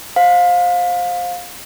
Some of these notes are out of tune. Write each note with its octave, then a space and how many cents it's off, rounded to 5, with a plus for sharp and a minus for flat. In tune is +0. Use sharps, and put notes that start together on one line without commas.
C5 +0 F5 +25